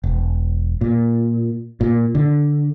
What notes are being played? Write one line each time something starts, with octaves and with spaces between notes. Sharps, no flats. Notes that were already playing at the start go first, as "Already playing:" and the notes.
E1
A#2
A#2
D3